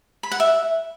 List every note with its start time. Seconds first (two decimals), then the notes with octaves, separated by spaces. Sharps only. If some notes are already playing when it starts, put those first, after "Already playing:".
0.23 B5
0.32 F#5
0.40 E5